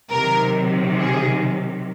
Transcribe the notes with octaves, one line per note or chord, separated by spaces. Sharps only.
C3 D#3 F#3 A#4
G#4